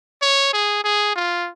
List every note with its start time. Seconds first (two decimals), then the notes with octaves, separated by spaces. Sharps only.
0.22 C#5
0.53 G#4
0.84 G#4
1.16 F4